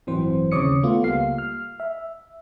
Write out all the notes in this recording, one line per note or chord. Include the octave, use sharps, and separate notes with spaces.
A1 G2 E3 F#3 C4 C5
D#2 C#3 C#5 D6 D#6 C#7
A3 B3 F4
C#2 G3 A#3 F5 C7
F6
E5